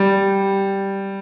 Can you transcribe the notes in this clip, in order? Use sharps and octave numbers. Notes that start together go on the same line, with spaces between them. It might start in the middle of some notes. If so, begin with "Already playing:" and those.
Already playing: G3